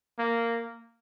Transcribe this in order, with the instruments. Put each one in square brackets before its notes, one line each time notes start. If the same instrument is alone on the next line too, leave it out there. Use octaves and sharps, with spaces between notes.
[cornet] A#3